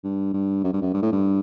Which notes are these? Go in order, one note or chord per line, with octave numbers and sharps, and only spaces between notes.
G2
G2
F#2
G2
F#2
G2
A2
G2